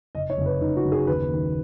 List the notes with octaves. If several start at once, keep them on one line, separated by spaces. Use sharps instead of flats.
F#1 D#5
C#5
F#1
B4
F#1 D#4
F#4
F#1
G#4
D#2 B4
D#3